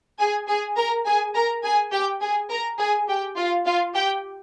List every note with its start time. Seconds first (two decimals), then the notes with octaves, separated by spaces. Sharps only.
0.19 G#4 G#5
0.48 G#4 G#5
0.77 A#4 A#5
1.06 G#4 G#5
1.35 A#4 A#5
1.64 G#4 G#5
1.92 G4 G5
2.21 G#4 G#5
2.50 A#4 A#5
2.79 G#4 G#5
3.08 G4 G5
3.37 F4 F5
3.66 F4 F5
3.95 G4 G5